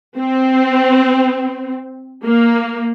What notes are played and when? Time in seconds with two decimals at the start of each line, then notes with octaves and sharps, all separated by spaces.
0.18 C4
2.24 A#3